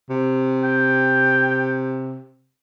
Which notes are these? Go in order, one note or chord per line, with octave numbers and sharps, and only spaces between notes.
C3
G5